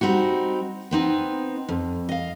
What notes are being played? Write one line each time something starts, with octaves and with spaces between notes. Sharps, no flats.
G3 C4 D#4 F#4
B3 C4 D#4
F2
D#5 F5